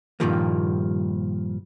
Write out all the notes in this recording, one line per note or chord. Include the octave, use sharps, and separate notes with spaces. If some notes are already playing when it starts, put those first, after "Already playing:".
G2 A#2 D#3 F3 G3 A#3